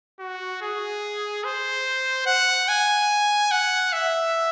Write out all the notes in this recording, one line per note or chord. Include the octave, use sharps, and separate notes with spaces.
F#4
G#4
C5
F#5
G#5
F#5
E5